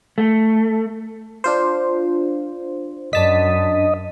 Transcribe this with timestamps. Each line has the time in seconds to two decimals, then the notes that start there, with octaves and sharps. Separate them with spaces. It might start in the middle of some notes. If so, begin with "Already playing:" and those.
0.18 A3
1.44 D4 F4 C5
3.13 F#2 D4 D#5 A5 B6